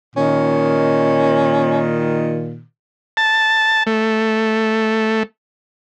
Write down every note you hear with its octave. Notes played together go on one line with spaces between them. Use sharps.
A#2 D#3 C#4
A5
A3